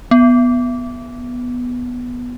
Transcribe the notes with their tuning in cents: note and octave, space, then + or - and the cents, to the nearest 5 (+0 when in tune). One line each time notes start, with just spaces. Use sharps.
B3 -5